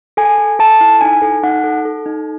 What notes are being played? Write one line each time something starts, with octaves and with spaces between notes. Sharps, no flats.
A4 G#5
A4
A4 A5
E4
D#4 G#5
A4
D#4 F#5
A4
A4
D#4